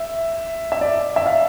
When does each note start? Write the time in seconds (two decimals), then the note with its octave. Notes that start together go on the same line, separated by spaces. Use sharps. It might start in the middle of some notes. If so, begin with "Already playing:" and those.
Already playing: E5
0.72 E5
0.81 D5
1.16 E5
1.26 F5